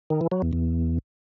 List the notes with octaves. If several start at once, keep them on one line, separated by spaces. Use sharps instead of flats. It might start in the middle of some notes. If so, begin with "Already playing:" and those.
D#3
E3
F#3
E2
E2